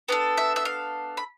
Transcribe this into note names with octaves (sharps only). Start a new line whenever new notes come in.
B3 D4 A4
E5
E5
F5
B5